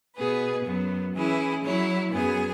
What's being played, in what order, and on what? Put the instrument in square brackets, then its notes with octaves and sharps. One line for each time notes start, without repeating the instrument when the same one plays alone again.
[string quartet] B2 B3 G#4 B4
F#2 F#3 B3
E3 C#4 E4 G#4
F#3 E4 C#5
F#2 F#3 B3 G#4